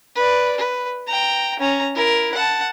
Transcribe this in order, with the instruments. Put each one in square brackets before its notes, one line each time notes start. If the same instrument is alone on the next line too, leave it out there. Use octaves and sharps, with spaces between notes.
[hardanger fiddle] B4 D5
B4
G5 A#5
C#4 A#5
E4 A#4
F#5 A5